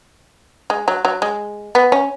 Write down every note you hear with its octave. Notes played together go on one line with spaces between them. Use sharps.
G#3
F#3
F#3
G#3
B3
C#4